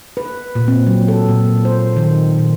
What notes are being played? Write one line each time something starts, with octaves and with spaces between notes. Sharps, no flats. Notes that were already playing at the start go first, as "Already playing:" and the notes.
B4
A#2
C4
F#3
A4
A#2
C5
D#3
A#2